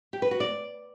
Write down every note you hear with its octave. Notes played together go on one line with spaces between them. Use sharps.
G4
B4
F#4
D5